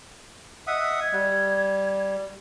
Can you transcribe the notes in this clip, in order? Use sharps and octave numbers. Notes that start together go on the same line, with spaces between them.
D#5 E5 F#5 D#6
G#6
G3